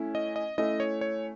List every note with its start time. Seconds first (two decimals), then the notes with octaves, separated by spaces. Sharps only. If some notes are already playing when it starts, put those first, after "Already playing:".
Already playing: A3 C#4 E4
0.15 D#5
0.36 D#5
0.58 A3 C#4 E4 D#5
0.80 C#5
1.01 C#5